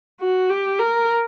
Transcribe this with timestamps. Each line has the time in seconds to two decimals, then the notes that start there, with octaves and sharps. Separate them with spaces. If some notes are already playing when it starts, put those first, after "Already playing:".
0.21 F#4
0.50 G4
0.79 A#4